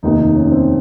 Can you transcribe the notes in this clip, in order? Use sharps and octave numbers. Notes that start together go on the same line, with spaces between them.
F1 D#2 D#3 D#4
D#4
C#4
C4